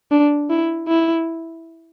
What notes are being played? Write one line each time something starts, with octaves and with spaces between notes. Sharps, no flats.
D4
E4
E4